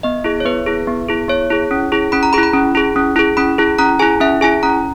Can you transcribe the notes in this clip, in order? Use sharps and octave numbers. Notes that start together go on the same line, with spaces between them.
B3 D#5
E4 G#4
C#5
B3 B4
E4 G#4
B3
E4 G#4
B3 C#5
E4 G#4
C#4
E4 G#4
C#4 B5
A#5
E4 G#4 B5
B5
C#4
E4 G#4
C#4
E4 G#4
C#4 B5
E4 G#4
C#4 A#5
E4 G#4 G#5
C#4 E5
E4 G#4 G#5
C#4 A#5